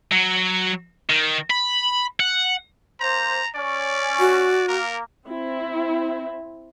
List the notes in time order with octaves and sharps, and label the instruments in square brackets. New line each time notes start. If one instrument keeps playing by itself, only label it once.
[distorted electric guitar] F#3
D#3
B5
F#5
[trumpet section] A#3 C5 [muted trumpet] A#5
[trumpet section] C#4 [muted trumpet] D5
[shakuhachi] F#4
[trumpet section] A#3 [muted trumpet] A#4
[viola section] C4 E4